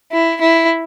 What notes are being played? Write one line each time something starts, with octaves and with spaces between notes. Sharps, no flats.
E4
E4